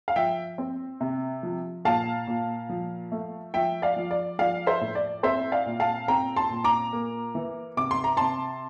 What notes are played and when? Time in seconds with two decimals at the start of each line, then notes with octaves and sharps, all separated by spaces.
0.08 F5
0.16 F3 E5 G5
0.58 C4
1.01 C3
1.43 F3
1.85 A#2 F5 A5
2.27 A#2
2.69 F3
3.12 A3
3.54 F3 E5 G5
3.82 D5 F5
3.96 F3
4.11 D5
4.39 F3 D5 F5
4.67 C5 E5
4.81 A2
4.95 D5
5.23 C4 C5 E5
5.52 D5 F5
5.66 A#2
5.80 F5 A5
6.08 C4 G5 A#5
6.36 A5 C6
6.50 A#2
6.64 A#5 D6
6.93 A#3
7.35 E3
7.77 C3 D6
7.91 C6
8.04 A#5
8.17 C3 A5 C6